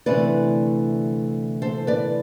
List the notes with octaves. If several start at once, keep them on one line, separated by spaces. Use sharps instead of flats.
D2 C3 E3 A3 B4 D5
A4 C5
B4 D5